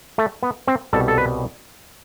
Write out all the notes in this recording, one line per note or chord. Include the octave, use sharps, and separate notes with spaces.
A3
B3
C4
C2 B2 G3 A4
A4
B4